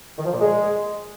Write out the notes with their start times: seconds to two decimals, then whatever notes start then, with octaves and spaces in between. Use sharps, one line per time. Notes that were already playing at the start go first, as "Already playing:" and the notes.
0.18 D#3
0.26 F3
0.33 A#2
0.40 G#3